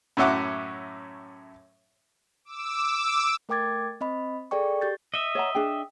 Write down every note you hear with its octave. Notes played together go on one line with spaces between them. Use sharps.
F#2 A2 C#4 E5 F#5 D6
D6 E6
A3 A#4 G5 D6 G#6 A6
C4 D#5 B5
G#4 A4 D5 G5 C#6
G4 G6 A6
D#5 E5
C#5 F#5 A#5
D4 G#4 G5